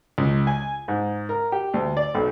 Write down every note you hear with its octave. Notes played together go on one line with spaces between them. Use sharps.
C#2
G#5
G#2
A#4
G4
D2
D5
B1